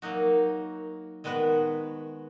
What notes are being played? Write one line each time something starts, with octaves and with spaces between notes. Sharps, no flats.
F#3 A#3 D#4 F#4
D#3 G#3 B3 F#4 B4